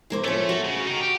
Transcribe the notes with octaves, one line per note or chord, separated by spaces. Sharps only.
E3 A#3 C5
F3 A3 C#4
F#4
C#3
D#4 A#4
G4